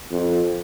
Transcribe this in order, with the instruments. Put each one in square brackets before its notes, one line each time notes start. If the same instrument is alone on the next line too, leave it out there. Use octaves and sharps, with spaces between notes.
[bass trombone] F2